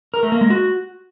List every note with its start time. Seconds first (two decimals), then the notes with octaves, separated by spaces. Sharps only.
0.14 A#4
0.23 A3
0.32 A#3
0.41 G#3
0.50 F#4